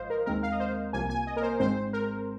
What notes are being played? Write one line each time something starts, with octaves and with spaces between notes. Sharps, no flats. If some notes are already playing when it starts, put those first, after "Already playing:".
Already playing: G#1 G#2 F3 C5 D#5 F5
A#4
D#2 D#3 G#3 C4 A#4
F5
D#5
C5
C2 C3 F3 A#3 G#5
G#5
D#5
A#4
C5
G#1 G#2 G#3 C4 C5
A#4